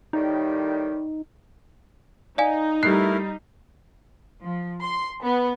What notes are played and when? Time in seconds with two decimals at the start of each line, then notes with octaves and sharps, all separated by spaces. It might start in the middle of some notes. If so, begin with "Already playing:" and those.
0.13 A2 D#3 G3 D#4
2.38 D#4 D5 F5 G#5
2.83 G3 A3 E4 A#4 F#6 C7
4.43 F3
4.81 C6
5.23 B3